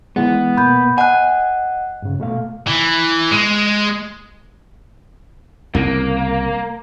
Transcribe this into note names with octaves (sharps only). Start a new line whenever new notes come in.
E3 G#3 B3
B2 A#3 B5 G6
D#5 F#5 G#5 F#6
G2 C#3
B2 A3 F5
E3
G#3
C2 C#3 A#3